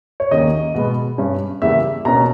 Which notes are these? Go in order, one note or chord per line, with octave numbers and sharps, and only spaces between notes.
C#5
D#2 D#3 A#3 C#4 D#5
B2 G#3 B3
G2 G3 C#4
E2 C#3 G3 A#3 E5
B2 A#3 C#4 A#5